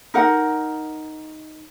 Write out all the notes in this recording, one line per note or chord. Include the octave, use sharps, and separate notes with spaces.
D#4 A#4 F#5